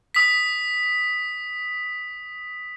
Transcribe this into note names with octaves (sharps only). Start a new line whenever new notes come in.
D#6 B6